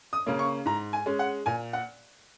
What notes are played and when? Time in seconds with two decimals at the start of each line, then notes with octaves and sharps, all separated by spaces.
0.13 D#6
0.26 C#3 A#3 C#4
0.39 C#6
0.65 G#2 A#5
0.93 G#5
1.06 G#3 C#4
1.19 F#5
1.46 A#2 G#5
1.73 F#5